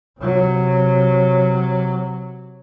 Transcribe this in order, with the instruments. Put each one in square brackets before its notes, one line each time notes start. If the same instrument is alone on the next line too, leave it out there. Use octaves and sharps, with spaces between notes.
[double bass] C3 F#3